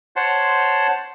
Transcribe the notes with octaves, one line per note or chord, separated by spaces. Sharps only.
C5 C#5 F#5 A5 C6